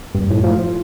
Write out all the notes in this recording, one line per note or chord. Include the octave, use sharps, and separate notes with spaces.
G2
A2
F3